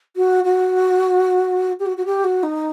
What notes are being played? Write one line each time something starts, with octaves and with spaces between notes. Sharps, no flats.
F#4
F#4
G4
F#4
F#4
G4
F#4
D#4